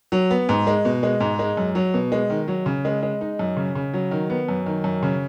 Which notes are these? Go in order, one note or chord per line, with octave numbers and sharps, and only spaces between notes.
F#3
B3
G#2
G#3
B2
G#3
G#2
G#3
F#2
F#3
B2
G#3
D#3
F#3
C#3
G#3
G#3
D#4
F#2
C#3
C#3
F#3
D#3
B3
F#2
D#3
F#2
C#3